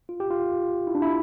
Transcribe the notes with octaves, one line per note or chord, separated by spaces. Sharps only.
F4
G4
F4
E4
D4
E4